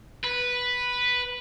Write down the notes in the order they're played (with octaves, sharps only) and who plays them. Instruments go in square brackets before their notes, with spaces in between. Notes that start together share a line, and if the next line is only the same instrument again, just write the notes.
[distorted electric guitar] B4